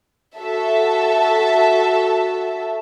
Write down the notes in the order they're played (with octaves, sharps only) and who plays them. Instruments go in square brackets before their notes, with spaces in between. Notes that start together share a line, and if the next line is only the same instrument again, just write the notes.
[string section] F#4 A4 E5